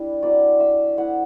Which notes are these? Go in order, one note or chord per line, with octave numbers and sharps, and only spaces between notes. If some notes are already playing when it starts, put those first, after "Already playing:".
Already playing: G3 D4 E4
F#3 C4 E4 D5
E5
A3 E4 F#5